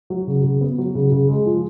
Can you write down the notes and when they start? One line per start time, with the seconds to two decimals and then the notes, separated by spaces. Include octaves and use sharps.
0.10 F#3
0.27 C#3
0.44 C#3
0.61 B3
0.78 F#3
0.95 C#3
1.12 C#3
1.29 G#3
1.46 F3